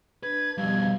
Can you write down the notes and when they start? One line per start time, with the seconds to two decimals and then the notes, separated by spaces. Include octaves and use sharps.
0.23 D4 B4 G#6
0.58 F2 B2 G3 F5 G#6